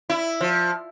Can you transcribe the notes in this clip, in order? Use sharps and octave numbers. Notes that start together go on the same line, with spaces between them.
E4
F3